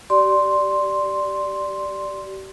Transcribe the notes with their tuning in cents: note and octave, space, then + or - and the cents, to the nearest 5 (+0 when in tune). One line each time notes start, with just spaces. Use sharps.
G4 -35 D5 +0 C6 +0